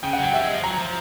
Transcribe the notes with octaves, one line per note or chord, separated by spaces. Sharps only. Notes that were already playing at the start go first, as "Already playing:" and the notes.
C#3 G5
F#5
F#3 G5
G3 E5
G#3
F3
F#3 A#5
F3